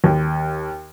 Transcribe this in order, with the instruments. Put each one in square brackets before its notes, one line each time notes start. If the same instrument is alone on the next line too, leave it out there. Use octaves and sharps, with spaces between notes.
[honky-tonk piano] D#2